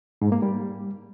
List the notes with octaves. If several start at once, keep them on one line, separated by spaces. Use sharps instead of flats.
G#2
A#3
G3